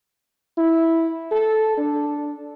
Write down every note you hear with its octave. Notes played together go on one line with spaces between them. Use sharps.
E4
A4
D4